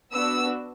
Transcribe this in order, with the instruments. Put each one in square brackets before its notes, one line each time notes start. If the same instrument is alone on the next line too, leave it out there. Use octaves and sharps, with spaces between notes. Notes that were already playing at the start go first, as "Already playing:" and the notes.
[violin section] B3 D4 F#4 E6